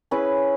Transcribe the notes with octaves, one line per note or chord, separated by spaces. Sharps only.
C#4 E4 G#4 B4